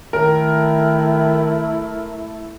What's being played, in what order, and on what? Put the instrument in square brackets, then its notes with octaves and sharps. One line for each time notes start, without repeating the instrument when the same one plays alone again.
[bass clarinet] D#3 [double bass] A3 E4 [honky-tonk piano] A#4